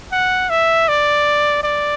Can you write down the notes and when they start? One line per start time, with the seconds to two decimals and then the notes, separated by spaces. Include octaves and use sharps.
0.12 F#5
0.50 E5
0.88 D5
1.63 D5